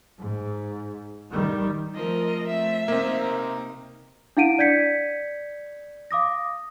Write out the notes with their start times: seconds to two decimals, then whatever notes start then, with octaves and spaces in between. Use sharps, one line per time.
0.19 G#2
1.31 D#3 G3
1.95 F3 A3 C4 A#4 D#5
2.48 A3 C4 E5
2.88 C3 A#3 C4 D#4 A#4
4.37 D4 E4 F5 F#5 D7 D#7
4.59 D5 G6 G#6 B6 C#7
6.11 F5 D6 D#6 A#6